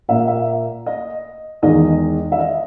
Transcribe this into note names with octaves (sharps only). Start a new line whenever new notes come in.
A#2 A#3 E5
E5
D#5
E2 D#3 G#3 D#5
E5
D#5